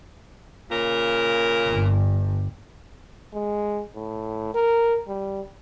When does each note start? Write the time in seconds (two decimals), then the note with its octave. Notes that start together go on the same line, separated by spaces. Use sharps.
0.71 A#2 C#3 A#4
1.67 G1 G2
3.34 G#3
3.95 A2
4.54 A#4
5.08 G3